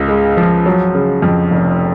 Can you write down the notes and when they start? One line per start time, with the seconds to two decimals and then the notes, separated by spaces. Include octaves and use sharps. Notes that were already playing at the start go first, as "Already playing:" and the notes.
Already playing: C#2 C#3
0.08 G#3
0.37 F3
0.66 F#3
0.95 C#3
1.22 F2
1.51 F1